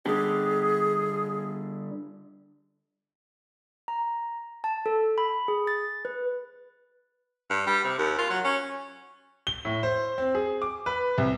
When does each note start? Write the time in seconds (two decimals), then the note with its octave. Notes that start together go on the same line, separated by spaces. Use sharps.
0.06 D3 G3 G4 G#4
3.88 A#5
4.64 A5
4.86 A4
5.18 B5
5.48 G#4
5.67 A6
6.05 B4
7.50 G2
7.67 G3
7.85 C3
7.98 D#2
8.18 F4
8.30 F#3
8.44 C#4
9.47 G7
9.65 A2
9.83 C5
10.18 C4
10.35 G#4
10.62 D6
10.86 B4
11.18 C2